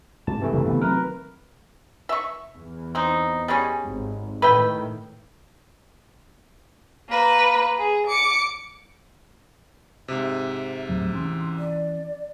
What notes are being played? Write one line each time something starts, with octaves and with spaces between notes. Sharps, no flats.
G#2 A5
G2 C3 E3 A3
E1 G2 C#3
C#3 B3
D#3 F#3 C4 A#4 B4
E5 C#6
E2
C4 D#4
G3 G#3 C#4
G#1
A2 D#3 B4 E5 G5
A#3 B4
G#4
D6 C#7
G#2 C3 E5
D#2 A2 F#3
E3 C#4 C6
D5